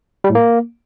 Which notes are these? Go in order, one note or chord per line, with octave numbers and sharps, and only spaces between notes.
G3
A2
A#3